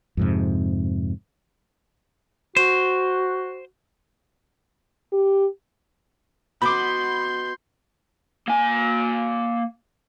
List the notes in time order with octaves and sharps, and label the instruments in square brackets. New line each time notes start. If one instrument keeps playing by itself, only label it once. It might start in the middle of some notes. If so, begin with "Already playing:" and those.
[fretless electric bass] F2 G#2 C3
[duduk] F#4 [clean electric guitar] C5
[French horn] G4
[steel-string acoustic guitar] B3 F#4 D#5 [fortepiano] B5 D6 [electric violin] C6 G6
[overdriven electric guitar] A#3 G#5